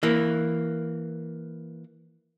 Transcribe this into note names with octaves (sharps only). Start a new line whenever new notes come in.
E3 A#3